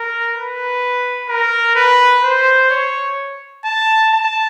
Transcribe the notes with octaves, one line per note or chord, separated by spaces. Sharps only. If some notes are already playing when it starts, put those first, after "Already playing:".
Already playing: A#4
B4
A#4
B4
C5
C#5
A5
A5